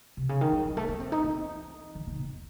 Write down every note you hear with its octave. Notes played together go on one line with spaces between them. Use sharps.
C3
C#3
D#3
F#3
F#3
A3
C#4
C4
D#4
E3
D#3
D#3
E2